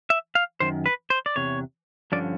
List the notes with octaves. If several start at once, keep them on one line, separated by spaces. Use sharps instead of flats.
E5
F5
F#2 D#3 C5
B4
C5
D5
E2 C3 C#5
G2 D3 F3 C#4 D5